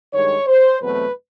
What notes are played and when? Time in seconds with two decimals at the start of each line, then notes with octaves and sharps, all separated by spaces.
0.12 G2 D#3 G#3 C#5
0.47 C5
0.81 E2 B2 F#3 A3 C4 B4